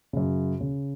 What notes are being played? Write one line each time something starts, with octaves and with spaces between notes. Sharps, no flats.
F#2 C#3
C#3